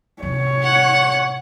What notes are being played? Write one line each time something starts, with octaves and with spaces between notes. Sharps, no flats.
A1 C3 C#5
F#5